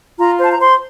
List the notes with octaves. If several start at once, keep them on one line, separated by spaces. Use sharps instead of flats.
F4 A#5
C5 A5
A#5
C5 C6